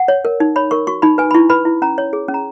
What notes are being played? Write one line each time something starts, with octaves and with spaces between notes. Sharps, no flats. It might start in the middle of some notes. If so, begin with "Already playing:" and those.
Already playing: F#5
C#5
A#4
D#4
C#5 B5
A#4 C#6
F#4 C#6
D#4 B5
B4 G#5
B5
E4 C#6
B4 B5
E4
C#4 A#5
C#5
G#4
C#4
A#5